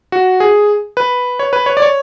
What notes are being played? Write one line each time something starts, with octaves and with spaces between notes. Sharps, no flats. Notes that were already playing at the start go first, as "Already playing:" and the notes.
F#4
G#4
B4
C#5
B4
C#5
D5
C#5